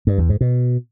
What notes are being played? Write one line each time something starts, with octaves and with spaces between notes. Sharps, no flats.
G2
E2
G#2
B2